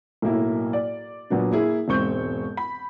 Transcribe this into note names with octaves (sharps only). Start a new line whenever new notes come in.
B1 A2 A#3 E4
D5
A#2 F#3 B3 D4
A#3 E4 G#4
E1 G#2 C4 C#6 G6
B5